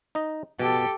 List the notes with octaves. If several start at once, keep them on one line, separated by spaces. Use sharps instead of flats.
D#4 D#5
B2 G4 A4